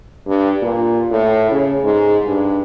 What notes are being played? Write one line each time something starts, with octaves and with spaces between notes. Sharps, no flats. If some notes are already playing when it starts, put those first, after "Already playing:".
G2
A#2
A2
C#3
G#2
G2